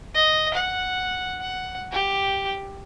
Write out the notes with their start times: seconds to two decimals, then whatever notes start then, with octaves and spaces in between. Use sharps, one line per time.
0.14 D#5
0.54 F#5
1.41 F#5
1.92 G4